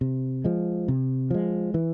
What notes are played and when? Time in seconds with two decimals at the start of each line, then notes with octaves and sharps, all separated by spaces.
0.01 C3
0.44 F3 G#3
0.88 C3
1.30 F3 G#3
1.74 E3